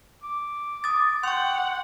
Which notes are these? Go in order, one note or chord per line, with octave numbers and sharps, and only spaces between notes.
D6
D#6 A6
F#5 G5 C6 C#6